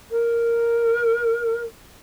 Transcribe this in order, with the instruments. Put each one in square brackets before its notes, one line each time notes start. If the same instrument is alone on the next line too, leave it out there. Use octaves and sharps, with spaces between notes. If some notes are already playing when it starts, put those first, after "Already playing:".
[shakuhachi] A#4